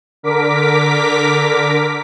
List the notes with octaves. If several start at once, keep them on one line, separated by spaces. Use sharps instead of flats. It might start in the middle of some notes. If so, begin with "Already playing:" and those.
D3 A#4 D6 B6